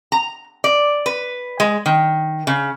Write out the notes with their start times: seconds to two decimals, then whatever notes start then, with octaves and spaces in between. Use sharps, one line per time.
0.12 A#5
0.64 D5
1.06 B4
1.60 G#3
1.86 D#3
2.47 C#3